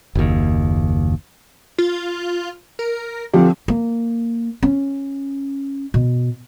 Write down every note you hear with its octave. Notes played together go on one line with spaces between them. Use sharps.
F#1 D#2
F4
A#4
D3 F3 C4 G4
A#3
C#4
B2